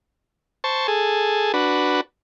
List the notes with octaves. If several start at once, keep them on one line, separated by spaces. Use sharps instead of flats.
C5 A5 C#6
G#4 A4
D4 F#4 B4